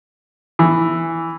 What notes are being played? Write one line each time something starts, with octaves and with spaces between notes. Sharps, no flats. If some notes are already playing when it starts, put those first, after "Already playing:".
E3